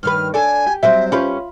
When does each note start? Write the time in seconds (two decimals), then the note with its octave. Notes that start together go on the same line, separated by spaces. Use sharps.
0.03 G2 D#3 B4 F6
0.34 D4 A4 D5 G#5
0.66 G4
0.83 F#3 G3 C4 C5 E5
1.12 C#4 F4 G4 B4 B5